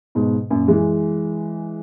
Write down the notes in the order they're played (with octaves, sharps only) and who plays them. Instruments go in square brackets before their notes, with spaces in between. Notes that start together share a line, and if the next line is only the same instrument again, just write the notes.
[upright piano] G#2 B2
F#2 A#2
E3 G#3